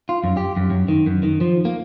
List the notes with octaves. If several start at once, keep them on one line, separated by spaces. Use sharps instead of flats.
F4
F#2
G4
F#2
F#2
D#3
F#2
D#3
F3
A#3